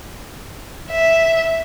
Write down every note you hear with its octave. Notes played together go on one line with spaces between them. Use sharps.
E5